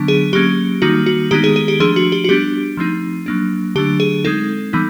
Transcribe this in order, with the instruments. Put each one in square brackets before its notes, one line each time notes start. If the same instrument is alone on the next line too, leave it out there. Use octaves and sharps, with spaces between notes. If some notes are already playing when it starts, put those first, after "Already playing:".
Already playing: [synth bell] D3 F#3 B3 D4
G#4
F#3 A#3 C#4 G4
D#3 G3 A#3 D#4 F#4
F#4
D#3 G#3 B3 D#4 G4
G#4
G#4
G4
F3 A3 D4 G#4
F#4
G4
F#4
G3 B3 D4 G4
F3 A3 C4 D#4
F#3 A#3 D4
D3 F#3 A3 D4 G4
G#4
G#3 C4 D#4 A4
E3 G3 B3 D#4